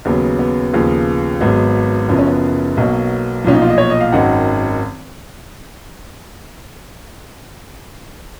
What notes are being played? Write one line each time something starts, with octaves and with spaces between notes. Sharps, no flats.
D#2 C#3 F#3 B3
B3
D#2 C#3 F3
G#1 G#2 F#3 B3
F#1 F#2 F3 B3
C#4
B3
B1 B2 F#3 A#3
B1 A#2 F3 C#4
D#4
F4
D#5
C#5
D#5
F5
G#1 F#2 D#3 F#3 F#5